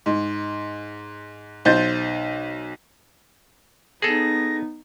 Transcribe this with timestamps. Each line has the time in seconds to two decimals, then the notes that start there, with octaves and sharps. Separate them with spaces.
0.06 G#2
1.65 B1 C5 G6 A6
4.02 B3 D#4 G#4 A4 A#6